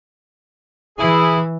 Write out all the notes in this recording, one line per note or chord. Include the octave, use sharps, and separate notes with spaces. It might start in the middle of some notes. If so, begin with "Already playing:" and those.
E3 E4 G#4